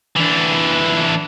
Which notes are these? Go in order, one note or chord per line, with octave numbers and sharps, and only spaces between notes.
E3 D4